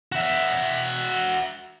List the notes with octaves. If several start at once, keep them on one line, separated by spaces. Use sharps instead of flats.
F#4 E5